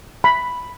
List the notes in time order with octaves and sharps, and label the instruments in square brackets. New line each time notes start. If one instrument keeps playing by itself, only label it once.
[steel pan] B5